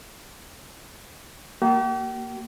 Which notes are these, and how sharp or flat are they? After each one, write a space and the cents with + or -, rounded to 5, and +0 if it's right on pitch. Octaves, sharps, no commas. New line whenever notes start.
A#3 +0 G4 -40